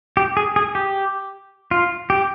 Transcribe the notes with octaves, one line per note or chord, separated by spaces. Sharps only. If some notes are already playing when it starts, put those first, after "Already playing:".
G4
G#4
G#4
G4
F4
G4